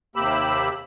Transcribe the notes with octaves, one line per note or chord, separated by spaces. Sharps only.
D#2 C3 A#3 G4 B5 E6